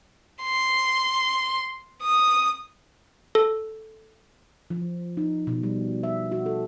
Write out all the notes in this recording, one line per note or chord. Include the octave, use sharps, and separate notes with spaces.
C6
D#6
A4
F3
D#4
B2
G3
E5
F#4
A4